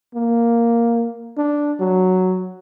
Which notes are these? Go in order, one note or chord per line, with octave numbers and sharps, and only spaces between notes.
A#3
D4
F#3